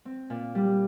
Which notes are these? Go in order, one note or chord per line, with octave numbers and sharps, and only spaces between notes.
C4
A#2
G3